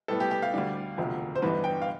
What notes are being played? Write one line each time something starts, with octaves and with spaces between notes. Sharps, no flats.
A2 G3 B3 A4
G4
G4
F5
D2 D3 G3 D4
E1 D2 C3 F3
C5
A1 G2 E3 B3 D4 B4
G5
F5